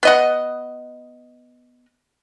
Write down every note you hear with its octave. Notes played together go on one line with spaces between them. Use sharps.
B3 D#5 F#5